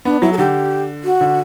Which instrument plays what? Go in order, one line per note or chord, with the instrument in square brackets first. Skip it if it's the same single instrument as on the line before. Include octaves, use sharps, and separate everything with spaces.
[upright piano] B3 [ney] D4
[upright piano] F#3 [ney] E4
[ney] A4
[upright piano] D3 [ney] G4
[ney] F#4
[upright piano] D3